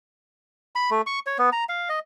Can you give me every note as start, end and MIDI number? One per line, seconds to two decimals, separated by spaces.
0.75 0.90 83
0.91 1.02 57
1.06 1.19 85
1.27 1.37 73
1.39 1.50 59
1.52 1.64 82
1.69 1.89 77
1.89 1.99 75